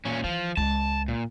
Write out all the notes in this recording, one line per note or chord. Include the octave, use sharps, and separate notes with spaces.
A#2 C#4
E3 F3
C#2 A5
A#2